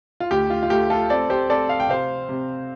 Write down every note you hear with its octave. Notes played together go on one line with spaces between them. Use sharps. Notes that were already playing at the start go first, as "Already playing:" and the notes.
F4
D2 G4
F4
F4
A3 G4
F4 A4
C4 A4 D5
G4 C5
C4 A4 D5
F5
G5
C3 C5 F5
C3